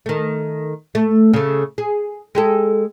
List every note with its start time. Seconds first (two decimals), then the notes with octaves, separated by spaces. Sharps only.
0.06 D#3 A3
0.95 A3
1.34 C#3 A3
1.78 G#4
2.35 G#3 G4 A4